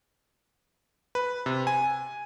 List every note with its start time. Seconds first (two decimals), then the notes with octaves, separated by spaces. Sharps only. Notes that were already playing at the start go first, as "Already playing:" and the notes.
1.15 B4
1.46 C3
1.67 G#5